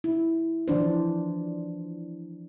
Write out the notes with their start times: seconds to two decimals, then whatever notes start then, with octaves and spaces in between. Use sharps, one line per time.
0.04 E4
0.68 E3 F3 D4 C5